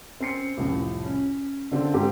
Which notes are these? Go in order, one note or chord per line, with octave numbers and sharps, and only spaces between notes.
C4 C#4 C7 C#7
C2 F2 A2
C#4
D3 F#3 C4 D4 F4 A4
G#2 C4 G4